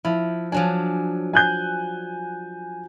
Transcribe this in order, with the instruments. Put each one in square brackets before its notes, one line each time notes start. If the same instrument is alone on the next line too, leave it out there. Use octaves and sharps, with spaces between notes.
[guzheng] F3 [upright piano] E4
[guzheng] F3 F#3 D4 [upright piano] G#5
[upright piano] G#5 F#6 G6